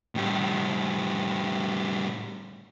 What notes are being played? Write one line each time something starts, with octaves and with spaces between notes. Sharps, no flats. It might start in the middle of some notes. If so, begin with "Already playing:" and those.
A2 G3